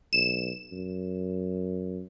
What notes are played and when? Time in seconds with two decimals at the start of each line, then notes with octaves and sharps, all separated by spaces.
0.13 B1 E7
0.72 F#2